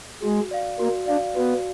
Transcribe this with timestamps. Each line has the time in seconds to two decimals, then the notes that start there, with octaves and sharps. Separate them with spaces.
0.22 G#3 F#4
0.51 D5 F5
0.80 A#3 F#4
1.08 D4 F5
1.12 D5
1.36 B3 F#4